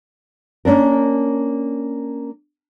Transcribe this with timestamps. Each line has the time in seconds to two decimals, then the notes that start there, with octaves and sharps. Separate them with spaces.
0.65 A#3 C#4 D4 A#4